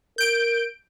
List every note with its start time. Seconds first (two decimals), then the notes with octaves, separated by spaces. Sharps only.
0.18 A#4 G6 D7